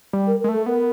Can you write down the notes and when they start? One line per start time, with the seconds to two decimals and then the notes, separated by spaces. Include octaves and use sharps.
0.13 G3
0.27 A#4
0.40 A#4
0.44 G#3
0.49 A3 A4
0.66 B3 A#4